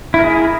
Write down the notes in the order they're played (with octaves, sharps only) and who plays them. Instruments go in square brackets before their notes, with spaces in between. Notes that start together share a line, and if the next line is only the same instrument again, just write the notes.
[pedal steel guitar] E4
A#4
G#4